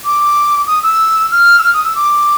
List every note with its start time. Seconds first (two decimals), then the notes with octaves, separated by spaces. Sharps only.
0.04 D6
0.67 D#6
0.83 E6
1.32 F6
1.59 E6
1.63 F6
1.74 D#6
1.85 E6
1.96 D6